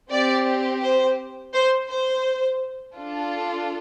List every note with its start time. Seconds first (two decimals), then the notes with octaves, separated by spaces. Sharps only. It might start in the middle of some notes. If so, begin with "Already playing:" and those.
0.11 C4 G4 D5
0.83 C5
1.54 C5
1.90 C5
2.97 D4 F4 A4